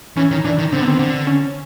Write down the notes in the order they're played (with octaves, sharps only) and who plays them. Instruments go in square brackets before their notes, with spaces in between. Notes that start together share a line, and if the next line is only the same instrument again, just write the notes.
[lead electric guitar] E3 [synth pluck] C#4
[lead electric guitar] D#3
[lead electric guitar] E3 [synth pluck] D4
[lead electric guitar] D#3
[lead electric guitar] D3 [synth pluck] C4
[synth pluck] B3
[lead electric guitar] D#3 [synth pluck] C4
[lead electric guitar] D3
[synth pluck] C#4